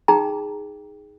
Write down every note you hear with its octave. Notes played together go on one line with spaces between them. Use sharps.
D#4 G#4 G5 A#5